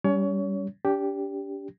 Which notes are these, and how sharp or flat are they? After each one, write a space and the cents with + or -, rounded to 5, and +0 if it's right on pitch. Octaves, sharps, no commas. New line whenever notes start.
G3 +0 C#4 +30 C#5 +30
D4 -40 G4 +0